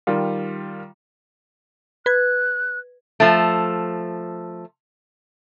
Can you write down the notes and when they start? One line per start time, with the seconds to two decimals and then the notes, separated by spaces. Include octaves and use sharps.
0.07 D#3 G3 F4
2.06 B4 F#6 G#6
3.20 F3 A3